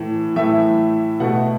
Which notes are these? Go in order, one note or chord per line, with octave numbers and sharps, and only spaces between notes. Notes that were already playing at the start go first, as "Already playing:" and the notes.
Already playing: A2 E3 A3
A2 E3 A3 E5
B2 A3 F#5